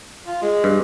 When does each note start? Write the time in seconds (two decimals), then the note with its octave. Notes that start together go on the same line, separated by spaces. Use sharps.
0.27 F4
0.42 G#3
0.64 G2